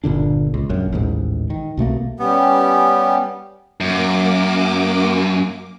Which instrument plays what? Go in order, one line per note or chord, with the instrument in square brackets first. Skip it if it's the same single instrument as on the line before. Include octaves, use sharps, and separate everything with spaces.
[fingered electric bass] G1 A#2 D3 D4
C#2
A#1 F#2
A1 D#2 G#2
D#3
C2 B2 A3 A#3
[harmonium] G3 C#4 G4 [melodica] B3
[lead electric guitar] F#2 [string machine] A#3 D6